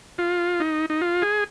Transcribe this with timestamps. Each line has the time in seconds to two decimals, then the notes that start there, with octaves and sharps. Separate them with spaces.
0.18 F4
0.60 D#4
0.90 D#4
1.02 F4
1.22 G#4